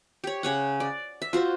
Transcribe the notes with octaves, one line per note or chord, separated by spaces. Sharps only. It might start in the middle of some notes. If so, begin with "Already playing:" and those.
G4 C#5
C#3 C#5 F#5
D5
E5
F4 F#4 C5